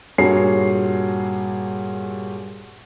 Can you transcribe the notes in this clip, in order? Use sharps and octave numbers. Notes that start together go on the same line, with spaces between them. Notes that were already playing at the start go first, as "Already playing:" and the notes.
G2 A#2 F#4 G#4 C#5 C7